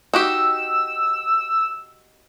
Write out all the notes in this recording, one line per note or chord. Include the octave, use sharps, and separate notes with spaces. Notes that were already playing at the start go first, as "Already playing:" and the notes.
D#4 F#4 G4 E6